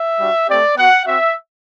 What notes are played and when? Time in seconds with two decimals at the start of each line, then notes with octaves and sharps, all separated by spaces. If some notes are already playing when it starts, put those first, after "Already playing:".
Already playing: E5
0.20 G3 D4 F#4
0.48 A3 C4 G4 D5
0.77 B3 F#4 F#5
1.06 C4 F#4 E5